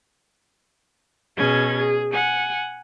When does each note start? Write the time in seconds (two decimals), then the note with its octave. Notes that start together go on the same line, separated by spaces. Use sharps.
1.36 B2 C#4 G#4 G#6
1.77 G#4
2.10 F#5 G#5